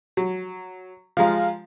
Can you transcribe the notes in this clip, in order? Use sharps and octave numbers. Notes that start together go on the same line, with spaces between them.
F#3
F3 G#3 F4 F5 A#5